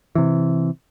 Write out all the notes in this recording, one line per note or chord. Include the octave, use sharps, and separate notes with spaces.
C3 E3